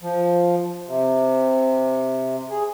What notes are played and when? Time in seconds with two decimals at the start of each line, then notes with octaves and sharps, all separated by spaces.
0.02 F3
0.88 C3
2.50 G#4